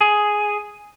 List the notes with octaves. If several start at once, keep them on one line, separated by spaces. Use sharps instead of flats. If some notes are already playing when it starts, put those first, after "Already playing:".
G#4